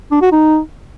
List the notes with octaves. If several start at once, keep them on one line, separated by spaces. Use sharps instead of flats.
D4
F#4
D#4